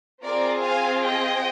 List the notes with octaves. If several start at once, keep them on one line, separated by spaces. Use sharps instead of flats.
C4 F4 G#4 A#4 D5
F5 G#5
D#5 G5